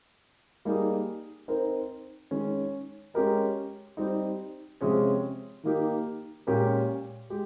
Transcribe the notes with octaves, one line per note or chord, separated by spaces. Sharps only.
G3 A#3 D#4 G#4
C4 D#4 A#4
D#3 G#3 C#4
G#3 C#4 G4 A#4 D#5
G3 C4 D#4
C3 F3 G#3 C#4 G#4
D#3 A#3 D#4 G4
A#2 G#3 C#4 G4 A#4
G#3 G4